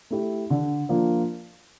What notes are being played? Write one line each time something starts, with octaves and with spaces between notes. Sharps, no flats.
A3 E4 G4
D3
F3 A#3 D4